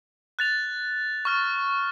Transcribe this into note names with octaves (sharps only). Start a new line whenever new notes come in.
F#6 A6 F7
C#6 F6 A6